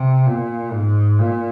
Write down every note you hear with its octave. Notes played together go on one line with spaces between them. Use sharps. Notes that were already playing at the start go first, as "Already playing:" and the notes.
Already playing: C3
A#2
G#2
A#2